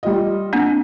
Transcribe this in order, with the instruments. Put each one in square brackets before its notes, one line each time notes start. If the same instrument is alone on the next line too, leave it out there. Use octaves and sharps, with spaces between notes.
[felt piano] G3 F4 D#5
[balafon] A#3 C4 D4